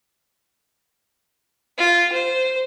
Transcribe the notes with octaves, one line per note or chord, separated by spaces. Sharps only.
F4
C5